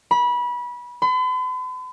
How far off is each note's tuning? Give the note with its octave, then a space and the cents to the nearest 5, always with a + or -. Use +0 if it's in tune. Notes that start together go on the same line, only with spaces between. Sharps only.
B5 -25
B5 +45